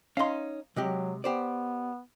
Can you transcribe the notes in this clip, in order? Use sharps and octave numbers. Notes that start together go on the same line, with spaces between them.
C#4 D#4 F5 C6
C3 F#3 G#3 G4
B3 G4 C5 D5